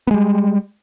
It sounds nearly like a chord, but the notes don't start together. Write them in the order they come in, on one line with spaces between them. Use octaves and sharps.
B3 G#3 G3